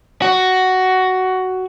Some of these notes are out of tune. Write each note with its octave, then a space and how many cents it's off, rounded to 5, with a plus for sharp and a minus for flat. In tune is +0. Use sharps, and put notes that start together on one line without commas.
F#4 +10